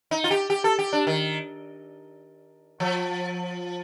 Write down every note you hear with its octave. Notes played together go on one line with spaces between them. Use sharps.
D#4
F4
G4
G4
A4
G4
D4
D#3
F3